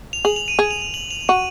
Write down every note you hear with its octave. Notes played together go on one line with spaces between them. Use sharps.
F7
G#4 F#7
F7
D#7
G#4
F7
F7
F#7
F7
F#4 D#7